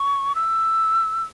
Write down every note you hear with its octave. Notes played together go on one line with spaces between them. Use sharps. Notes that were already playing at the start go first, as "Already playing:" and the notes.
Already playing: C#6
E6